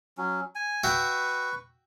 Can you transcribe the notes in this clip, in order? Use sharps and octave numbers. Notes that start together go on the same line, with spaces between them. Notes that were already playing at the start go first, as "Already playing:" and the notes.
F#3 C#4
G#5
F#4 B4 E5 G5 C#6